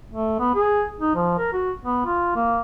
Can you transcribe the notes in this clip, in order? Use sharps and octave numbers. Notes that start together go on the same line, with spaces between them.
A3
B3
G#4
D#4
F3
A#4
F#4
B3
F4
A#3